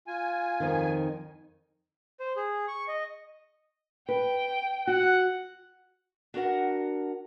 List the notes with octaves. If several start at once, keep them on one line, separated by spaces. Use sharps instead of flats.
F4 G#5
F2 D#3
C5
G#4
C#6
D#5
B4 G5
F#4 F#5
D4 F#4 A#4 F#5